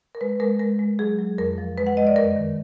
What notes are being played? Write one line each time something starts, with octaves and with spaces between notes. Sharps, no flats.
A#4
G#3 B4
G#3 A#4
G#3 A#4
G#3
F#3 G#4
F#3
F2 A#4
F3
G#3 B4
F#5
G#3 D#5
D5
F#2 A#4
D#3